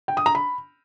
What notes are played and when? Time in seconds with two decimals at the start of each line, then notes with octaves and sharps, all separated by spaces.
0.08 G5
0.17 D#6
0.26 A#5
0.35 B5